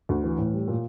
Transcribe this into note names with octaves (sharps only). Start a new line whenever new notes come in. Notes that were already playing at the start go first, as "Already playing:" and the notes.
D2
E3
A2
G3
A#2